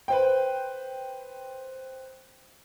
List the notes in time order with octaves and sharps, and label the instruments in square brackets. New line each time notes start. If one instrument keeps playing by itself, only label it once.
[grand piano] B4 C5 G5